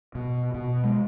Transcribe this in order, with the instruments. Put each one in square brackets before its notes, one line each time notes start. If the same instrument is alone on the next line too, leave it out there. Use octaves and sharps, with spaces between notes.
[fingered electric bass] B2
B2
G#3